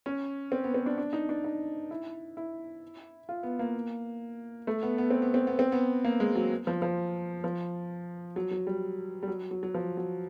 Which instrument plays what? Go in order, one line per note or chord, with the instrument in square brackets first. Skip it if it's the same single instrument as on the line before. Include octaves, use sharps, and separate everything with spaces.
[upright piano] C#4
C4
B3
C4
D4
D4
D#4
D4
D#4
E4
E4
F4
B3
A#3
A3
B3
B3
C4
B3
C4
B3
C4
B3
A#3
G#3
F#3
F3
F3
F3
F#3
F#3
G3
G3
F#3
F#3
F#3
F3
F#3